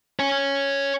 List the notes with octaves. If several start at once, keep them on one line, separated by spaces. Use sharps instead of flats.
C#5 G#5